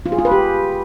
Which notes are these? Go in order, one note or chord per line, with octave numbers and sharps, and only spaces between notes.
F4
G#4
F4
B4
G4